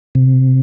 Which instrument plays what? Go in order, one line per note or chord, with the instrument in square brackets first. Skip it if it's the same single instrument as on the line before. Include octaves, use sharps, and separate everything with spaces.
[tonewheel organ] C3